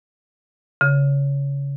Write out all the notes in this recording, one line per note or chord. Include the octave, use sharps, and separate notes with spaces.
C#3